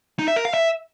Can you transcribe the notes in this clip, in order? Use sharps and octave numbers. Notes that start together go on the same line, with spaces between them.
D#4
E5
A#4
F5
E5